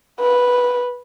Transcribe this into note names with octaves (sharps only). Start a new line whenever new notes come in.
B4